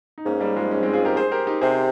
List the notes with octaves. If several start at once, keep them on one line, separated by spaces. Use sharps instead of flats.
D#4
G#2 A#3 C#4
G3 A#3
F3 G#3
C#4
G#3 C4
F4 G#4
G4 A#4
G#4 C5
G4 A#4
D#4 G4
C3 G#4 C5